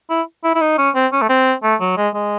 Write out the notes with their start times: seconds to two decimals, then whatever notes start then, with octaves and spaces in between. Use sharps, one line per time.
0.10 E4
0.44 E4
0.55 E4
0.61 D#4
0.78 C#4
0.95 C4
1.12 C#4
1.22 A3
1.29 C4
1.63 A3
1.80 F#3
1.97 G#3
2.14 G#3